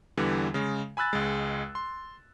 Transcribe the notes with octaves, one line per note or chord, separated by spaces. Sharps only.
E2 D3 E3 G3
C#3 G#3
G#5 B5 E6 F#6 A6
C#2 G#3
C6